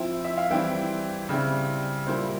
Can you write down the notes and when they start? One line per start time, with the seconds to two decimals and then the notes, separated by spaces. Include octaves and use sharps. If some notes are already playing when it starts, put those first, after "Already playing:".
Already playing: F3 C4 E4
0.24 E5
0.38 F5
0.50 E3 G3 C4 E4 G5
1.29 C#3 G3 C4 E4
2.07 A#2 G3 A#3 E4 C5